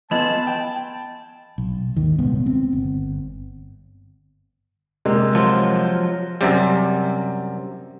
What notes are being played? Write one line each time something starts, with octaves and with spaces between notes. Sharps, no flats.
E3 B3 F4 D#5 A5 B5
G5
B1
G#1 D#2 D#3
D#1 C2 G#2 B3
C4
G1
C3 G#3 A#3
F3 F#3 F4
F#2 C3 G3